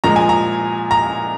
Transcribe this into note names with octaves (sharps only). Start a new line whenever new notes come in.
A#2 F3 G#3 A#5
G#5
A#5
A#5